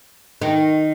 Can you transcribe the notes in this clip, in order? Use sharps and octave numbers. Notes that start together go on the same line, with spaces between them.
D#3